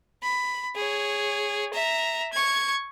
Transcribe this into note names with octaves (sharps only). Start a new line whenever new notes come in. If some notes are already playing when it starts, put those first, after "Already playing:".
B5
G#4 C#5
E5 A#5
C#6 G#6